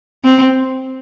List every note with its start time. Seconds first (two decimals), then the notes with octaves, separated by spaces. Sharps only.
0.24 C4